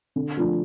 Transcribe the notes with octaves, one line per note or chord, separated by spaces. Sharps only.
D3
F3 A3 D4 F4